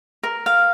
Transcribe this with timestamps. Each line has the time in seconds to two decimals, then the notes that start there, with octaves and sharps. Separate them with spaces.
0.23 A#4
0.46 F5